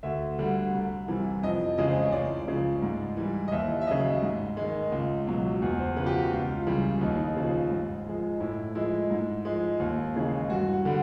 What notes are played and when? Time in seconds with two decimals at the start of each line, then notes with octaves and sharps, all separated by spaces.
0.03 D2 E5
0.38 D3 G3
0.73 C2
1.08 C3 E3 G3
1.43 F2 D#5
1.78 C#3 E3 G#3 D#5
1.91 C5
2.02 C#5
2.12 C#2 D5
2.48 C#3 F3
2.82 G#2
3.17 E3 G3
3.48 D#5
3.52 D#2 E5
3.81 E5
3.87 C#3 F#3 D#5
4.22 G#2
4.57 D#3 G#3
4.92 C#2
5.27 B2 F#3
5.62 E2
5.80 C5
5.96 C#3 F3 B4
6.06 G4
6.14 F#4
6.32 C#2 F4
6.66 C#3 E3 G3
7.01 D#2 D#4
7.17 D#4
7.36 C#3 F3
7.71 G#2
8.06 F3 G#3
8.40 A2 E4
8.75 F3 G#3 E4
9.11 G#2
9.45 F3 G#3
9.80 D#2
10.16 C#3 E3 G#3
10.50 G2 F#4
10.73 F#4
10.85 D3 G3